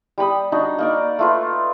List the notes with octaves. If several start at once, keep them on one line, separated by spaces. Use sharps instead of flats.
G3 G4 B5 D#6
D4 D#4 F#4
A#3 D#4 D5
A3 F4 B4